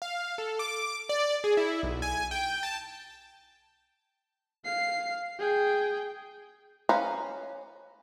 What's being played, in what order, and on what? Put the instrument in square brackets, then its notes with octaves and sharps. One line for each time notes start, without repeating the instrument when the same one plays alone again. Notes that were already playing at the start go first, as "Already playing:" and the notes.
[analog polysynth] F5
A4
D6
D5
G#4
E4
B1
G#5
G5
A5
[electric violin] F5 C7
G#4 G5
[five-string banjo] C#4 B4 C5 F5 A#5